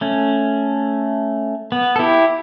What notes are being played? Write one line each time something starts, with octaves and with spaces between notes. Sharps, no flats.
A3 C#4
B3
A4
E4 G4